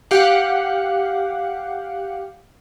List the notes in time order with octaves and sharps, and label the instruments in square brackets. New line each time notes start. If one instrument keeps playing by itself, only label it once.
[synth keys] G4 F5 F#5